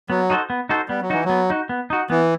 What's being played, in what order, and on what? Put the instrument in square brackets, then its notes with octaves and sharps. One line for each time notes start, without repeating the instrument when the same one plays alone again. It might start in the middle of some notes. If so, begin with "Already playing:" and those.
[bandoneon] F#3 [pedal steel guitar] B3
[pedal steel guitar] D#4 F#4 A4 C5
B3
D#4 F#4 A4 C5
[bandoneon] G3 [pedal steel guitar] B3
[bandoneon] F#3
[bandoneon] E3 [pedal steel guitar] D#4 F#4
[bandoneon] F#3 [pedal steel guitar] B3
[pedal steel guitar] D#4 F#4
B3
D#4 F#4
[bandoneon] E3 [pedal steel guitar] B3